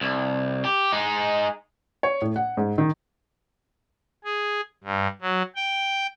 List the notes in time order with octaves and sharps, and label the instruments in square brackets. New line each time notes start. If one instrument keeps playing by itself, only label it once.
[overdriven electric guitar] C2
G4
G#3 D#4
[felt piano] C#5
A2
F#5
G#2
D#3
[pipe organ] G#4
G2
F#3
G5